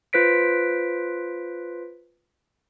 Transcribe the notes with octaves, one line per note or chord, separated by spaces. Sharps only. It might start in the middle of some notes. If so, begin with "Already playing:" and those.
F4 B4 C5 B6 D7